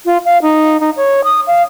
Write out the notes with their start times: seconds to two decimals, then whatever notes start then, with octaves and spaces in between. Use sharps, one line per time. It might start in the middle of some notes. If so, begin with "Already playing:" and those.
0.06 F4
0.25 F5
0.42 D#4
0.80 D#4
0.97 C#5
1.24 D#6
1.47 F5